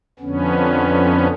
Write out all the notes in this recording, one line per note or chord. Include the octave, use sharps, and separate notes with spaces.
F2 D3 B3 C#4